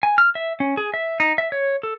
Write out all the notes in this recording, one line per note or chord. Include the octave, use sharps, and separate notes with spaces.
G#5
F6
E5
C#4
G#4
E5
D#4
E5
C#5
A4